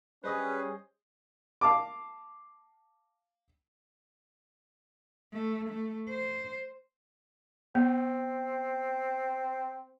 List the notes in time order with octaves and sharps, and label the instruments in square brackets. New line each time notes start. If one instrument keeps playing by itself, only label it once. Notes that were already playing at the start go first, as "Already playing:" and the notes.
[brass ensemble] G3 C#4 [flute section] G#4 [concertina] B4 [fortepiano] C5 D#5 D#6
[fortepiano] F5 A5 D6
[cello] A3
A3
C5
[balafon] B3 [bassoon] C4